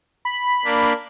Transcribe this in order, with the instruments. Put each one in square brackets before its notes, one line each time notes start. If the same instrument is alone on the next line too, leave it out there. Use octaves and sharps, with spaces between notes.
[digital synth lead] B5
[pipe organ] A#3 D4